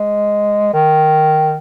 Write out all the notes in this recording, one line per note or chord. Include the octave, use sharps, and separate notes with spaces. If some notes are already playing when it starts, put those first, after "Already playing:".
Already playing: G#3
D#3